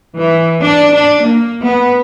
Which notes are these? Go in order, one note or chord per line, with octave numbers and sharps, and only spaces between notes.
E3
D4
D4
A#3
B3